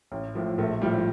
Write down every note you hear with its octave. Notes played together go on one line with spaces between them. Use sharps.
A1
A2 F3
A#1 A3
A2 F3 G3
G3